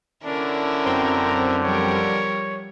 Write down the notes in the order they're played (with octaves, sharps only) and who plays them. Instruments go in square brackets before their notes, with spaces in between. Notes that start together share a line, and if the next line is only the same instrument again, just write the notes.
[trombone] D3 [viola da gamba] C#4 E4 A#4 [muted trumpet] D4
[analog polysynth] F#2 C4 G5 [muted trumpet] A#5
[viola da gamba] F3 G3 A#4 [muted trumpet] C#5